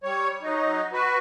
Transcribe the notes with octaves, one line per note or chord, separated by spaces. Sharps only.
G3 C#5
F#3 D#4
F#4 B4